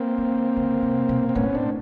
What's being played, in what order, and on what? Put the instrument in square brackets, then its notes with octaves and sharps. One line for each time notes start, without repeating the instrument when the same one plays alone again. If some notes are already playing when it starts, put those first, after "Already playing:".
Already playing: [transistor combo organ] A#3 C4
[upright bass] D3
C#3
C3
B2
[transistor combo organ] C4
[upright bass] A2 [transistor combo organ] B3 C#4
[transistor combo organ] C4 D4